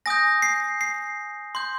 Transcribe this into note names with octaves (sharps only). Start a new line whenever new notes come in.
G#5 D#6 G6 A#6
C7
C7
C6 G6